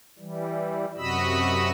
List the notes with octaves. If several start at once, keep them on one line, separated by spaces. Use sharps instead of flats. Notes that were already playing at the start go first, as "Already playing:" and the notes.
E3 G3
F#2 C3 F#4 D#5 B5 E6